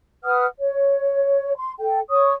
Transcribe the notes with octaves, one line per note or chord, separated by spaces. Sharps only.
B4 F#5 D#6 F6
C#5
C6
A4 G5
C#5 C#6 D#6